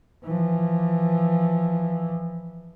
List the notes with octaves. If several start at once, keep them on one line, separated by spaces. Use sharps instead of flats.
E3 F3